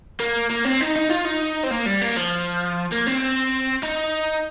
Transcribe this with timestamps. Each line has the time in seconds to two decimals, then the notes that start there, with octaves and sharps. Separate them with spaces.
0.20 A#3
0.50 A#3
0.65 C4
0.80 D#4
0.96 D#4
1.10 F4
1.25 D#4
1.64 C4
1.71 A#3
1.86 G3
2.01 A#3
2.17 F3
2.92 A#3
3.07 C4
3.83 D#4